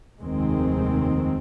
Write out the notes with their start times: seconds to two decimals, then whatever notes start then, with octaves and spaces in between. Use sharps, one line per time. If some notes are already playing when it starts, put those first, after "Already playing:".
0.20 F1 D#2 D#3 G#3 C4